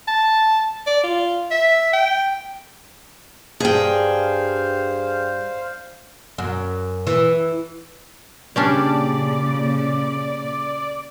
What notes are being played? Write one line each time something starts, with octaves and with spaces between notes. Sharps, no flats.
A5
D5
F4
E5
G5
G2 G#4 C5 F5 G5
F#2
E3
A#2 C#3 G3 C#4 D4 D5